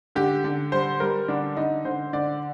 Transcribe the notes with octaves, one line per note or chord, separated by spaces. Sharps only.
D3 G4
D3
G3 C5
G3 A#4
D3 D4
D3 D#4
D3 C5
D3 D5